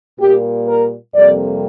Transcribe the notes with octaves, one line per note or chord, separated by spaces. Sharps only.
A#2 G3 A#3 G4
A#4
F2 C3 G3 A#3 D5